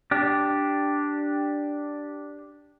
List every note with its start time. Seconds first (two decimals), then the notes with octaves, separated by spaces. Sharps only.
0.11 D4 G4